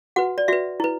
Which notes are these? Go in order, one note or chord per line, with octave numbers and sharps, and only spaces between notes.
F#4 B4 F#5
D5
F#4 B4 E5
E4 B4